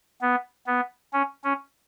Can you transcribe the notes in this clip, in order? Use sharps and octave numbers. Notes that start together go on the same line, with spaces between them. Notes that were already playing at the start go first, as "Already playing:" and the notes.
B3
B3
C#4
C#4